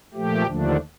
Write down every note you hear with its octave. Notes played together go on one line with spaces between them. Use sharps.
A#2 F3 A3 G4
D#2 D3 F3 A3 D4